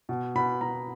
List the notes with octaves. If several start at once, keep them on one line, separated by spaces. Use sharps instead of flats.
B2
B2 B5
B2 A#5